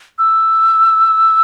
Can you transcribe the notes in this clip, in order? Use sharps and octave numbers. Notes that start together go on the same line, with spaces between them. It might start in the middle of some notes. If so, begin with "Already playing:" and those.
E6